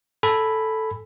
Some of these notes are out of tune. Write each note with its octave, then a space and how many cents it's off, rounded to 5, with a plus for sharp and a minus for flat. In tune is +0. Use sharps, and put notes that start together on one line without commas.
A4 +0 G#5 +0 B5 +0